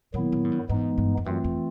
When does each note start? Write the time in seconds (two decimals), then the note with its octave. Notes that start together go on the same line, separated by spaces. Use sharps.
0.14 A#2 D#3 F#3 B3 E4
0.32 A#2
0.45 G#2
0.52 G2
0.69 G#2 E3 G#3 B3 D#4
0.98 G2
1.17 F2
1.26 F#2 E3 A3 C4 F4
1.44 F2